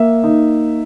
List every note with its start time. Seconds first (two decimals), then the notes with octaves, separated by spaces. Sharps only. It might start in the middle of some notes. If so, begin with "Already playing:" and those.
Already playing: A#3 E5
0.24 D#4